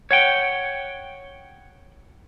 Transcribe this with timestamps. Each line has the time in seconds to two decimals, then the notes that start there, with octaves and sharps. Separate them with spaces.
0.11 C#5 F#5 G5